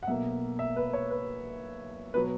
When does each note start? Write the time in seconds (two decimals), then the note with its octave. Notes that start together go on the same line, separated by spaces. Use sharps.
0.03 F#5
0.07 B1 B2 A#3 E5
0.59 E5
0.76 B4
0.93 C#5
1.10 B4
2.14 B2 F#3 B4